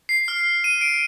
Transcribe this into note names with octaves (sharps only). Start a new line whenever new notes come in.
C7
F6
D#7
D7